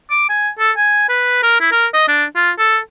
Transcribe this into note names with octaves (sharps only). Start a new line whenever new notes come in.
D6
G#5
A4
G#5
B4
A#4
E4
A#4
D#5
D4
F4
A4